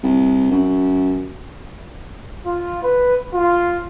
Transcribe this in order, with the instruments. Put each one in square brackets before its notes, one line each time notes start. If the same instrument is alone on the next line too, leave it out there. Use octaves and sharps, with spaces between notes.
[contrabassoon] C2
F#2
[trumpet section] F4
B4
F4